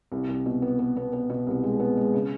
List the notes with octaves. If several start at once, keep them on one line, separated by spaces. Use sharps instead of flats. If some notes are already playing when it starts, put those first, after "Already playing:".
C2
C2
B2
B3
B3
B3
B3
B2
C2
G#3
B3
G#3
C#3